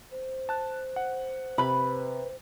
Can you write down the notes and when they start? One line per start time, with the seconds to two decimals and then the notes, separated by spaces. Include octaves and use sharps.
0.11 C5
0.49 A5 F#6
0.96 F#5
1.58 C3 B4 B5